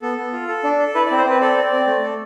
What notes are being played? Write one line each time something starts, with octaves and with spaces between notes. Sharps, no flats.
B3 A4
B3
F4
A4
D4
A4
E4 B4
D5
C4
C5
C4 B4
A4 D5
C4
C4
A3
A4